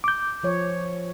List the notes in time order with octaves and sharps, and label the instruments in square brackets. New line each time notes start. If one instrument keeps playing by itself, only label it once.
[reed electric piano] D6 G6
[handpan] F3 C#5